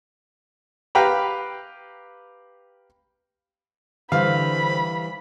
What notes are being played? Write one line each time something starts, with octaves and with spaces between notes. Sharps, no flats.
G4 B4 F5 G5 A#5 B5
D3 E3 G3 C5 F5 B5